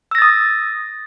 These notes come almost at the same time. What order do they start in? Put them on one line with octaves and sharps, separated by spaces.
E6 A#6 A6 D#6